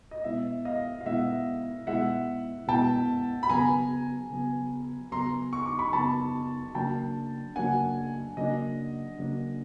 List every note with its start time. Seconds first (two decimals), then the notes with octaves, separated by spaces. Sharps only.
0.11 D#5
0.24 B2 G#3 B3 E4 E5
0.65 D#5 F5
1.01 F5
1.05 B2 G#3 B3 E4 E5 F#5
1.87 B2 G#3 B3 E4 E5 F#5
2.68 B2 G#3 B3 E4 G5 A5
3.43 B5
3.49 C#3 F#3 B3 G#5 A#5
4.30 C#3 F#3 B3
5.12 C#3 F#3 B3 A#5 C6
5.53 C#6
5.66 D6
5.79 B5 C#6
5.93 C#3 F#3 B3 A5 B5
6.75 C#3 F#3 A#3 D4 G5 A5
7.56 C#3 F#3 A#3 D4 F#5 G#5
8.37 C#3 F#3 A#3 D4 D#5
9.19 C#3 F#3 A#3 D4